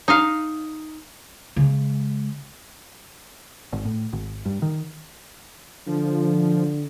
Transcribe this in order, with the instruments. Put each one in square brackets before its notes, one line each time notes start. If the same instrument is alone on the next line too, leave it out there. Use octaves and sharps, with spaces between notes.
[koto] D#4 D#5 F5
[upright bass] C#3 G#3
[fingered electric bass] G#1
A2
G#1
G2
D#3
[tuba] D3 [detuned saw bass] F3